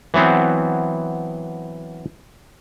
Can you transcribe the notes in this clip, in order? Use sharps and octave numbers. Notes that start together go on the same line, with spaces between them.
E3 F#3 B3 C4